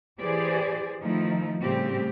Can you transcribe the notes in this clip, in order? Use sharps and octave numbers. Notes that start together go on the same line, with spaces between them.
E3 G4 G#4 C5 D5
D#3 F3 A3 D#4 E4
A2 C#3 G3 C4 G4